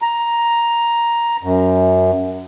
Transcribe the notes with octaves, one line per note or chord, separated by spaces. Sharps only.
A#5
F#2